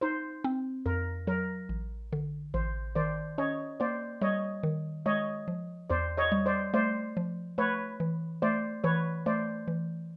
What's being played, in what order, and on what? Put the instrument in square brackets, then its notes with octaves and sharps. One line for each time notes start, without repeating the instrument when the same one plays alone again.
[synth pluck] D#4 [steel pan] C5
[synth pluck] C4
[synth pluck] F2 [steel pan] A#4
[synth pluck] F#3 [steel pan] A#4
[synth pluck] A1
D3
[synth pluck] A1 [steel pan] C5
[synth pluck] D#3 [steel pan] C5 D5
[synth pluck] C#4 [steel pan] C#5 D#5
[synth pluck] A#3 [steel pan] C5 D5
[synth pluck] G3 [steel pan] C#5 D#5
[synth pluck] D#3
[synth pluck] G#3 [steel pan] C#5 D#5
[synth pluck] F3
[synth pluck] E2 [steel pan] C5 D5
[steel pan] C#5 D#5
[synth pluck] G3
[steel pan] C5 D5
[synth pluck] A3 [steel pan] C5 D5
[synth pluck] F3
[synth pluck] A3 [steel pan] B4 C#5
[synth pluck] E3
[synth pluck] A3 [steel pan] C5 D5
[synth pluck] E3 [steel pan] B4 C#5
[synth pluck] A3 [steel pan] C5 D5
[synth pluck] E3